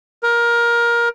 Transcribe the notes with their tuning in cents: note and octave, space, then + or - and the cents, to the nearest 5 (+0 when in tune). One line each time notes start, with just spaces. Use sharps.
A#4 +20